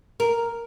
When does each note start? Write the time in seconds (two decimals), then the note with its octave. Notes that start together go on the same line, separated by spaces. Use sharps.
0.20 A#4